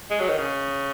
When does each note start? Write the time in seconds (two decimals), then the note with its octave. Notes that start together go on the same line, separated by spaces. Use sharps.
0.10 G#3
0.20 F#3
0.29 D#3
0.38 C#3